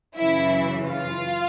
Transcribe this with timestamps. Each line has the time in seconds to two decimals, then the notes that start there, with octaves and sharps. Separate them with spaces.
0.17 F#2 C#3 E3 E4 E5
0.88 F4 F5